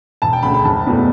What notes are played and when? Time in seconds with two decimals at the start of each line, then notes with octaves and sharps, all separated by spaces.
0.22 E1 A5
0.33 G5
0.43 D2 C#3 B5
0.54 B5
0.65 F#1 A5
0.86 E2 B2 A3